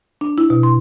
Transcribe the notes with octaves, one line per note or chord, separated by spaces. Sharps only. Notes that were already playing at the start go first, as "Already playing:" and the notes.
D4
E4
B2
C6